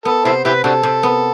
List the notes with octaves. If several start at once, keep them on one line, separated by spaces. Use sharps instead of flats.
B3 A4
C3 E4 A4 C5
C3 E4 G4 B4
C3 D4 F#4 A4
C3
B3